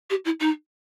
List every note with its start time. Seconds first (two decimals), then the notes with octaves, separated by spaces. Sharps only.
0.10 G4
0.24 E4
0.40 D#4